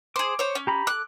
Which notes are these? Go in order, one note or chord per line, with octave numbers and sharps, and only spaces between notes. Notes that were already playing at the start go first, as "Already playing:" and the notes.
G#4 C5 D6
C5 C#5
C#4
G4 A#5 B5
A4 D6 F#6